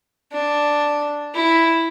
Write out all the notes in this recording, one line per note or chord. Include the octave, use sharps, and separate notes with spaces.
D4
E4